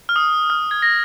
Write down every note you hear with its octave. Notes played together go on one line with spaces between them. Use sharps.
F6
D#6
F6
G#6
A#6